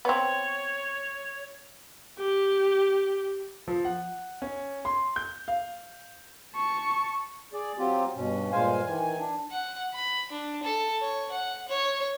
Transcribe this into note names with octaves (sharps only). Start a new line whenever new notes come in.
B3 C4 C#5
G4
F3
F#5
C#4
C6
G6
F5
A5 C#6
G#4 D5
F#3 C4 F4 G4
G2 B2 C#4
G2 A#2 G#3 C5 F5 G#5
D#3 E3 G#5
D4
F#5
B5
D4
A4
C#5
F#5
C#5